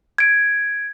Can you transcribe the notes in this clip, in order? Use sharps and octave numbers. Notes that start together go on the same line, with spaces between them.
G#6 D7